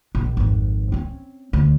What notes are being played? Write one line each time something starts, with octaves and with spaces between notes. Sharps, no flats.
A#1
G#1 F2
C4 C#4
D2